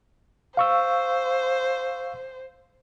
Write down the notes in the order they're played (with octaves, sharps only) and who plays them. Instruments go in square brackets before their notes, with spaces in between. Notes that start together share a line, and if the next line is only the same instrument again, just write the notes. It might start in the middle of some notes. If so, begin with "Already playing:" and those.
[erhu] C5 [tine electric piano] F5 C#6 E6